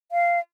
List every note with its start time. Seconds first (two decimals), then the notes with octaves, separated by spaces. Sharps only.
0.12 F5